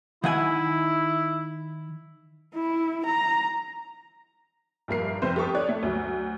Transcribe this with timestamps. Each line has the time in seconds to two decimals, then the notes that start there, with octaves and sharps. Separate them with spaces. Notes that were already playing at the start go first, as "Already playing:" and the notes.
0.24 D#3 E4 F#5 G#5
2.55 E4
3.06 A#5
4.88 A#1 G2 A#4 C7
5.22 F1 C4 B4 C5
5.36 G4 A4 G5 C#6 D#6
5.55 C#5 D5 F#6
5.69 A3
5.83 D2 F#3